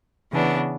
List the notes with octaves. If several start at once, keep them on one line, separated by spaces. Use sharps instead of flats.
C#3 E3 B3 D4